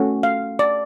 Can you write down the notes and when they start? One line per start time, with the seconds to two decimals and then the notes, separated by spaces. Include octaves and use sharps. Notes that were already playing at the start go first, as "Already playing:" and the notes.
Already playing: A3 C#4 F#4
0.23 F5
0.59 D5